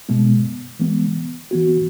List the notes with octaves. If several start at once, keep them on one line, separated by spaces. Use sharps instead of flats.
B2 G#3 B3
E3 G#3 B3
E3 B3 F#4